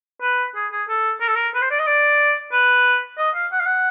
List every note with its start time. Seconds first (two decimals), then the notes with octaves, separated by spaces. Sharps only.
0.22 B4
0.55 G#4
0.72 G#4
0.89 A4
1.21 A#4
1.28 A4
1.35 A#4
1.55 B4
1.62 C5
1.71 D5
1.79 D#5
1.87 D5
2.52 B4
3.18 D#5
3.35 F5
3.52 F#5
3.59 F5
3.66 F#5